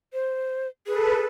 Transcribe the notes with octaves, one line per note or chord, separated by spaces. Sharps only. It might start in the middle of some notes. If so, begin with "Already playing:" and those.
C5
G#4 A4 B4